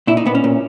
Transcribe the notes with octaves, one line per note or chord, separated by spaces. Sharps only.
A#2 E4
D#4
A#2 B3
C#4
A#2